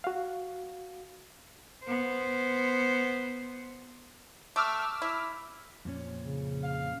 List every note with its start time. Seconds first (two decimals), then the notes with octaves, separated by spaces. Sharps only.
0.04 F#4 F5
1.84 B3 C5
4.56 A3 D6 E6 F6
5.02 E4
5.85 F2 A#2 C#4
6.21 C#3
6.64 F5